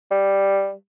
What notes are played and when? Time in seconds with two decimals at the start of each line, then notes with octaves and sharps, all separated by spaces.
0.11 G3